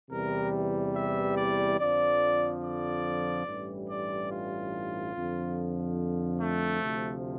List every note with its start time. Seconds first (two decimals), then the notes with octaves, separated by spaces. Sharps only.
0.10 E2 C3 E3 G3 A#4
0.95 E5
1.37 D5
1.78 F2 D3 F3 D5
2.62 D5
3.46 A1 G2 E3 G3
3.89 D5
4.30 F4
5.13 F2 D3 F3
6.40 A3
6.82 D2 C3 F3